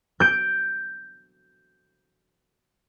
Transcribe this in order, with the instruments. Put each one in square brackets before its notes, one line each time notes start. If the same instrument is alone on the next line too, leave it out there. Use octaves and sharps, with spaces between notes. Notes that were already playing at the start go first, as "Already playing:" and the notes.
[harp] G6 D7